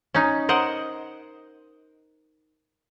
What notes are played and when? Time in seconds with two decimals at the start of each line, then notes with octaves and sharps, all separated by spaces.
0.14 C#4 D#4
0.49 A#4 C5 D#5 F#5